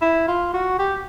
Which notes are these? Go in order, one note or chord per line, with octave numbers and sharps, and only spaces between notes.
E4
F4
F#4
G4